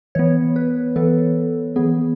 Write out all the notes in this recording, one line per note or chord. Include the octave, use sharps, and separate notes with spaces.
E3 B3 C#5
B4
E3 B3 A4
E3 B3 G#4